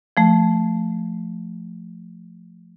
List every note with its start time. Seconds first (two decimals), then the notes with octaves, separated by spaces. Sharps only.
0.17 F3 A3